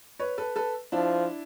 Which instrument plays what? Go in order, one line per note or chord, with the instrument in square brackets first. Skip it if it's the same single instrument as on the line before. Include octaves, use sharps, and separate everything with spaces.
[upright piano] B4 C#5
A4 B4
A4 B4
[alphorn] F3 [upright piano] D4 E4